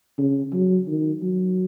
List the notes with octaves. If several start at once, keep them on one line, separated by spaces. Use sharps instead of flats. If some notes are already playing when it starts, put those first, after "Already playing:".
C#3
F#3
D#3
F#3